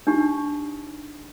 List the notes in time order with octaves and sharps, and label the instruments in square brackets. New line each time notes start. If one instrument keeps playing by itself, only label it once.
[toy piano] D4 D#4 G4